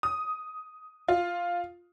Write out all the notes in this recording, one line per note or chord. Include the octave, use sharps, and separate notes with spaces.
D#6
F4